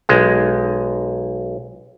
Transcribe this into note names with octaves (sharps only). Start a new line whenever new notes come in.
B1 G#3